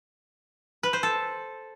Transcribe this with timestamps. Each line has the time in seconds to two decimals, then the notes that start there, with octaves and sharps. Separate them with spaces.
0.83 B4
0.93 C5
1.03 A4